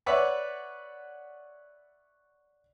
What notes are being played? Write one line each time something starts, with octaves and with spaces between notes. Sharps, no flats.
B4 C#5 D5 E5 F#5